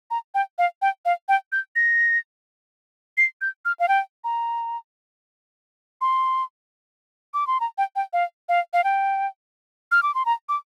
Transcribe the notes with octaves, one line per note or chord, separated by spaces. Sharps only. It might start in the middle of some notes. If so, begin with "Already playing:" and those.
A#5
G5
F5
G5
F5
G5
G6
A#6
C7
G6
F6
F5
G5
A#5
C6
D6
C6
A#5
G5
G5
F5
F5
F5
G5
F6
D6
C6
A#5
D6